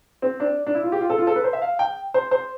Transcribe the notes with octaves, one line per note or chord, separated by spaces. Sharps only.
C4
D4
D4
E4
F4
G4
F4
A4
F4
A4
B4
C5
E5
F5
G5
C5
C5